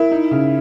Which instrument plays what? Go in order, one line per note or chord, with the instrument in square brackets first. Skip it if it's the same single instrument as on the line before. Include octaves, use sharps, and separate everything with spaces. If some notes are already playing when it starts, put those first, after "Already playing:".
Already playing: [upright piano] E4 [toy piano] A#4
[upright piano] D#4
C#3